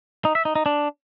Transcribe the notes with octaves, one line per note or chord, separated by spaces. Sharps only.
D#4
E5
D#4
D#4
D4